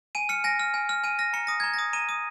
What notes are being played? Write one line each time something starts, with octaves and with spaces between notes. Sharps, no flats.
G#5 D#7
F6 C#7
G#5 A#6
F6
G#5
F6
G#5 D#7
F6 A#6
A#5 C#7
D#6 A#6
A#5 G#6
D#6 A#6
A#5 D#7
D#6